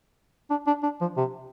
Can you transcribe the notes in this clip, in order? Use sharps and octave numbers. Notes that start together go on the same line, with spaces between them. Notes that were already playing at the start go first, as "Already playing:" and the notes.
D4
D4
D4
F3
C3